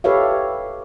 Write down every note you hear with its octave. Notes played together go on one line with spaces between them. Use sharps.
G4 A4 B4 C#5 E5 F5